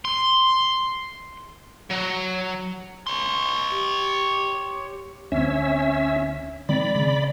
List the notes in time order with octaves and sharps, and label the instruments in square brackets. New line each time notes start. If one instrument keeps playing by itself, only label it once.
[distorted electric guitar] C6
F#3
[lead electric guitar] C#5 C6
[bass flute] G4
[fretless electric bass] D2 C4 [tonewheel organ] C#4 E5
[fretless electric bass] D#3 G#3 C4 [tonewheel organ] D5 B5
[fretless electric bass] C#3